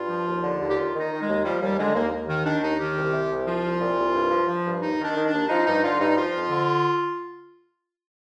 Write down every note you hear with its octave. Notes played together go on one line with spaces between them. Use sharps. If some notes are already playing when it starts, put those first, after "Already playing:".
Already playing: G2 F4
F3
D#2
D3
D#2
G4
D#2 F4
D#3
D#4
D#3
G#3
D#2
F3 G3
D#2 G3
D3 G#3
D#2 A#3
D#2
D#3
D#3 D4
D#2 D#4
D#3 G4
C2
C3
C2
F3 F4
C2
A#2
C2
G2
F3
F3
G2
D#2 D#4
D#3
D4
D#3
D4
D#2
F3 D#4
G2 D#4
D3 F4
G2 D#4
F3 F4
F2
D3